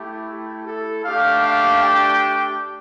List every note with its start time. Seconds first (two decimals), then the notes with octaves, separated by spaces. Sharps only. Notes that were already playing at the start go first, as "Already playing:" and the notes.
Already playing: A3 E4 G4
0.31 G4
0.67 A4
1.04 A3 D4 G4 F5
1.42 F5
1.79 G5